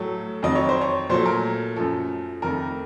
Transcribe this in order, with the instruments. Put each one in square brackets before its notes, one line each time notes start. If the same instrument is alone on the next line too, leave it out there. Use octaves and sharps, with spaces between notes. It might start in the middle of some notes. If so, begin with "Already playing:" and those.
Already playing: [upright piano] A2 F#3 A3
F2 D#3 F#3 D#5
C#5
C5
C#5
A#2 F#3 A3 C5
A#4
F#2 F3 A3 A4
F2 D#3 A3 A#4